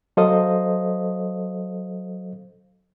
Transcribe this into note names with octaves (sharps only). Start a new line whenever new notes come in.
F#3 A4 C5 D#5 F5 D#6